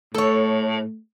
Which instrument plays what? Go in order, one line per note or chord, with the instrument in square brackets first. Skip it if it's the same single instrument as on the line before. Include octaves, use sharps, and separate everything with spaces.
[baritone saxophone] A2 [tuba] A3 [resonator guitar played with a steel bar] A4 C#5